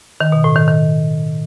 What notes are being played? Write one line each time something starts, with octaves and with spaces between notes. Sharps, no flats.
D#3
B2
A2
D#3
D#3